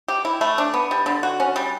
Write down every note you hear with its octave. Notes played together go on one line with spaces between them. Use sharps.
G4
E4
A3
D4
B3
G3
D3
F#4
C#4
G3